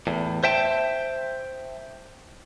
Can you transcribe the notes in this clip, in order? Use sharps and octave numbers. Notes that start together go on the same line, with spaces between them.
E2 A2
C5 E5 G5 A5